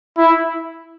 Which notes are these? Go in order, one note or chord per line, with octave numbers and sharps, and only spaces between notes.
E4